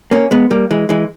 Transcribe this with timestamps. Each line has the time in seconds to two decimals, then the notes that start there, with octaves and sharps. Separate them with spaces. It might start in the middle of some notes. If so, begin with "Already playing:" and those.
0.11 A#3 C#4
0.31 G#3 B3
0.51 G3 A#3
0.71 E3 G#3
0.89 E3 G#3